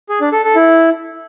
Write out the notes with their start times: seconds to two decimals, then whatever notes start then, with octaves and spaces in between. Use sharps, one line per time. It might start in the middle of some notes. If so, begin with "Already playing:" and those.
0.09 G#4
0.21 D4
0.32 A4
0.44 A4
0.55 E4